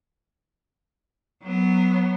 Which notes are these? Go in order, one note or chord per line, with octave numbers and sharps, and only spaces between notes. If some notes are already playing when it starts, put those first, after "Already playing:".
F#3 B3